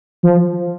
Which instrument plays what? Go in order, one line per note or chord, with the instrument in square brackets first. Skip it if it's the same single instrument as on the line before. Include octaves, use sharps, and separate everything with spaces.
[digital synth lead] F3